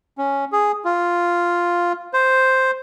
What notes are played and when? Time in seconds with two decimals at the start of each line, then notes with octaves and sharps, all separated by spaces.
0.18 C#4
0.52 G#4
0.85 F4
2.13 C5